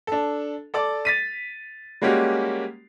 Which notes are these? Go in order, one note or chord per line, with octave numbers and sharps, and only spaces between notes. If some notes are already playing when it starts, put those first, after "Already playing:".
D4 A4
A4 D5 D6
A6 B6 D#7
G3 G#3 A#3 C#4 F#4 G4